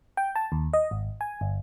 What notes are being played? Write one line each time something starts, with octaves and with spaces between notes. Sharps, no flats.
G5
A5
D#2
D#5
G#1
G#5
G1